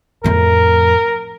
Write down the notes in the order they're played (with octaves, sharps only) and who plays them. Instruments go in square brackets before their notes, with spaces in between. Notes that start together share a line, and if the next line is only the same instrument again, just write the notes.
[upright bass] F2 A2 [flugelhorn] A#4